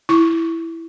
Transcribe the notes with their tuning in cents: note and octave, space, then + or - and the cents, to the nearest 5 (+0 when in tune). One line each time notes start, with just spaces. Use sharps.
E4 +5 C#6 +0